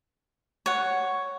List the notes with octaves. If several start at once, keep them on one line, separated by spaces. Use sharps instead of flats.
C#5 F#5